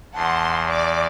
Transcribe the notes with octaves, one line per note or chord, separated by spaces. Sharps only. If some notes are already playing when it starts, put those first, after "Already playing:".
E2 F#5 A5 C6
D5 D6